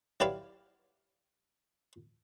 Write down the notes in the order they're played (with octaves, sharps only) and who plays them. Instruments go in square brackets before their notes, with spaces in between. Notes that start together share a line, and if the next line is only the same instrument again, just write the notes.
[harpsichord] F#3 E4 G4 B4 D5 F5